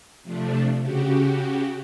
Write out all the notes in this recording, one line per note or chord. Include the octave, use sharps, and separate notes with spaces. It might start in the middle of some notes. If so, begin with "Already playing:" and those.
C3 F3 A3 D4
C#3 F#4 G4